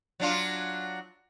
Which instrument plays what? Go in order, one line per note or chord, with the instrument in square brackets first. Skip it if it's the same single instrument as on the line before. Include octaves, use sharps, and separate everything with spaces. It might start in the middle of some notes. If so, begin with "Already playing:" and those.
[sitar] F#3 D4 F4